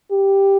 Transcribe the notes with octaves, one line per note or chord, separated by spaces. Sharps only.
G4